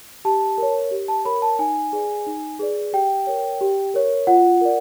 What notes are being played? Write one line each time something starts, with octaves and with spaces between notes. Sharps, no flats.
G4 A5
A#4 C#5
G4
A5
A#4 C#5 B5
A5
D#4 G#5
G#4 B4 D5
D#4
G#4 B4 D5
G4 G5
A#4 C#5
G4
A#4 C#5
F4 F#5
A#4 D5